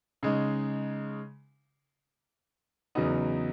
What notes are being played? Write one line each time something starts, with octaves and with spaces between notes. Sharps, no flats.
C#3 G#3 D#4
E2 C#3 F#3 B3 D#4